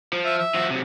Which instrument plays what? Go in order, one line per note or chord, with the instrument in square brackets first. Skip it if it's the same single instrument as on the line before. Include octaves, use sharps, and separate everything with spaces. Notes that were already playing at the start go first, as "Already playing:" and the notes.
[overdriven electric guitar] F3
[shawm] E5
E5
[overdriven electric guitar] F3 F#4
C3 F#3